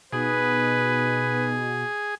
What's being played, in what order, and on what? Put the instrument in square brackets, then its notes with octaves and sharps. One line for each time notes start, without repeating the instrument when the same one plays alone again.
[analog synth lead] B2 [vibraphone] B3 D#4 [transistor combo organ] G#4 [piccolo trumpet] B4